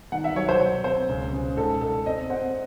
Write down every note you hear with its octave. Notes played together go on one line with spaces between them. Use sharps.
D#3 F#5
E5
F#3 C#5
C5
F#3 C#5
C4 C5
C#2
C#3
G#2 A4
G#2 A4
C4 D#5
C4 F#5